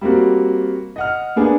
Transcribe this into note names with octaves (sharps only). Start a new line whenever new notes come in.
G3 A#3 C4 F#4
D#5 F#5 F6
A#3 B3 D4 G#4